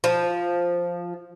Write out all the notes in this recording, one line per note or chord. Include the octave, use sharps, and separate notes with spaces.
F3